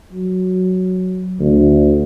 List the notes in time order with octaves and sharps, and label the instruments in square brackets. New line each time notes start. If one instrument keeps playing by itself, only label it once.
[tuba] F#3
D2